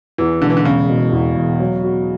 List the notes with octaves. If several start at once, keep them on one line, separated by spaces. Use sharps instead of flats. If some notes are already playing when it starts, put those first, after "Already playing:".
E2 E3
E1 D3
E3
D3
E1 C#3
B2
E2
E1
F#3
F#4